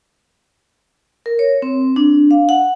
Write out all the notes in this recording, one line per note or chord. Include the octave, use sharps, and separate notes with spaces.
A#4
C#5
C4
D4
F5
F#5